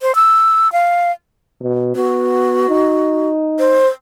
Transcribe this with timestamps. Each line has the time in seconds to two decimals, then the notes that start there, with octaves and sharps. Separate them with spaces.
0.02 C5
0.15 E6
0.72 F5
1.61 B2
1.95 B3 F#4
2.69 D#4
3.59 C5